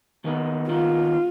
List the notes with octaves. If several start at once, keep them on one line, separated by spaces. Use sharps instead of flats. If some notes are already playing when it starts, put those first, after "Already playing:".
D#2 D#3 B3 D#4
D#2 D#3 B3 D#4 F4